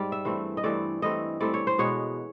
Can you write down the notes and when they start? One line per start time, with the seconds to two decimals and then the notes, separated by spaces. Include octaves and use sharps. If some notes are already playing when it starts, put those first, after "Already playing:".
Already playing: G#2 G3 D5
0.12 E5
0.25 G2 E3 A3 C4
0.57 D#5
0.63 G2 E3 A3 C4 D5
1.02 G2 E3 A3 C4 D#5
1.41 G2 E3 A3 C4 D5
1.54 C#5
1.67 C5
1.78 B2 G#3 B3 C#5